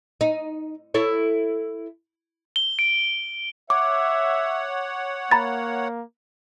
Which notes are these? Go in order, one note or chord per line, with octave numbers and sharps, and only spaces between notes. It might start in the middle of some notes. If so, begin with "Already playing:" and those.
D#4
E4 A4 C#5
G7
D7
C#5 E5 F#5 D6
A#3 A#5 B5 A6